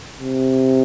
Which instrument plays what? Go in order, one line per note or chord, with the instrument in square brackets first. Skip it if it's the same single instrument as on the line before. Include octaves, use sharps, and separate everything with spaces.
[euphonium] C3